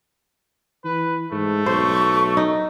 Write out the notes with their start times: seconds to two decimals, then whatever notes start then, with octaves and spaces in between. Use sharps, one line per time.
0.85 E3 B4
1.32 G#2 A3
1.66 B1 C5 C#6
2.37 D#4